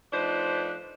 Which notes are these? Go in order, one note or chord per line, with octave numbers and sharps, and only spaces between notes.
F3 A3 D4 D#4 B4 C5